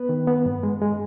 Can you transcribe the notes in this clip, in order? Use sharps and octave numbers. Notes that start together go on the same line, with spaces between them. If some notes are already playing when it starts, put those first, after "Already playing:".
Already playing: B3 B4
D#3
B3
G2
G#3
G#3